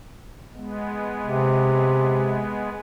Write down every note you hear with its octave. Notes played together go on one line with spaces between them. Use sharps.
G#3 B3
C3